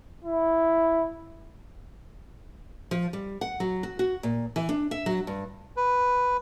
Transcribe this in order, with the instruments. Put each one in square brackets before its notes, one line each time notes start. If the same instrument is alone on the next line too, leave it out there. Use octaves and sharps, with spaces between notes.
[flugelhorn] E4
[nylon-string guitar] F3
G3
F#5
F#3
F#4
F#4
A#2
E3
D4
E5
F#3
G2
[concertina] B4